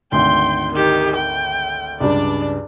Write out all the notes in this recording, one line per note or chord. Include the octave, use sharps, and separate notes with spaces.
G#1 D2 G5 C6
D#3 G4
G5
C#2 G2 D4 D5